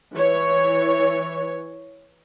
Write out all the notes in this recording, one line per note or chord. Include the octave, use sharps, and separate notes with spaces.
E3 C#5